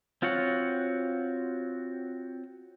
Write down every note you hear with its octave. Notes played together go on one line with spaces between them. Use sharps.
C4 F4 F#4 C#5 F#5